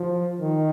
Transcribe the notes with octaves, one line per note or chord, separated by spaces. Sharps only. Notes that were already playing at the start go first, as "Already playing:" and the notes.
Already playing: F3
D#3